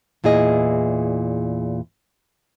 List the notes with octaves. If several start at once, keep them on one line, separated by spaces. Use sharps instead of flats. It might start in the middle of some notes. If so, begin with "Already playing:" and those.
E2 A#2 E4 G#4 D#5